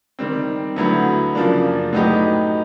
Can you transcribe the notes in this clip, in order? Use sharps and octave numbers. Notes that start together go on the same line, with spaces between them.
D#3 G3 C4
D2 D3 F#3 B3 E4
F#2 C#3 F3 A#3 D4
A2 F#3 B3 D#4 G4